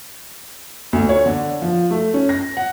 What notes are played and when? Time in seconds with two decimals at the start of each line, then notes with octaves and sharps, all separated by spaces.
0.93 D2
1.09 C#5
1.26 D3
1.62 F3
1.91 A3
2.14 C#4
2.29 A#6
2.57 F#5